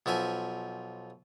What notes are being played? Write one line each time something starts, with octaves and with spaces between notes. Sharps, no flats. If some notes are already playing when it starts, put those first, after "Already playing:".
B1 F3 E5 G#5